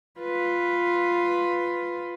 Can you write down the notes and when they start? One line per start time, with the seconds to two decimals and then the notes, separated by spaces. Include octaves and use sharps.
0.20 F4 B4